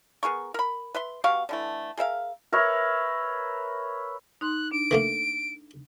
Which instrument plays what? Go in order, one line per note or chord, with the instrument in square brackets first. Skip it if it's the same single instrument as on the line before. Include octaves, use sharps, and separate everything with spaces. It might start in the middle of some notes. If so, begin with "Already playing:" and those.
[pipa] B3 G#4 A#4 C#6
A#4 B5
B4 E5 C6
B2 G4 F5 C#6
D3 E3 A3
G#4 A#4 E5 F5
[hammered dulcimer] A#4 B4 C#5 E5
[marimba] D#4 C6 [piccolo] F#6
[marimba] D4 [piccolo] D7
[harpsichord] D#3 A3 A#3